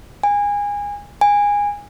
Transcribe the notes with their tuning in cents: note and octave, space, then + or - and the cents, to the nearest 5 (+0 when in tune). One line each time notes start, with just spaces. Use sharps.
G#5 -25
G#5 -20